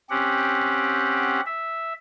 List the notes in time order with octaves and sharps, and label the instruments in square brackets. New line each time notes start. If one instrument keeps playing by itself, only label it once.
[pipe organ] C4 C#4 G4 F#5
E5